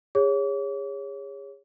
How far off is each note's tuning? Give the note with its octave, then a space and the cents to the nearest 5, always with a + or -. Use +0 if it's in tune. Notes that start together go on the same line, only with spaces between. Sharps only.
G#4 -30 C#5 +0 D6 -40